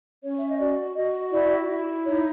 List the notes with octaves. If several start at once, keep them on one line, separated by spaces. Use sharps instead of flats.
C#4 C#5
E5
D#5
F#4 D5
F#4 D#5
E4 D5
E4
D#4 C#5